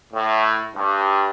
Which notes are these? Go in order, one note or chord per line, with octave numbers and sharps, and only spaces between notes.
A2
G2